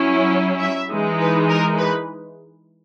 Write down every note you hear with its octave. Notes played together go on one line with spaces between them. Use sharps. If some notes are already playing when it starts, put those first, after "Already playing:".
Already playing: F#3 C#4 E4
E5
E3 G#3 D#4
B4
A#4
B4